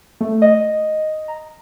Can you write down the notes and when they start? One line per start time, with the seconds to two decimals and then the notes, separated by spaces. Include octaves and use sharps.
0.21 A3
0.42 D#5
1.28 A#5